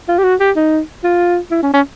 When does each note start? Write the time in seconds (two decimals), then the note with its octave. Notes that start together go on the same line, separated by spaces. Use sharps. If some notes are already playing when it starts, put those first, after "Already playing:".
0.08 F4
0.18 G4
0.23 F#4
0.40 G4
0.56 D#4
1.04 F4
1.51 E4
1.62 C#4
1.73 C#4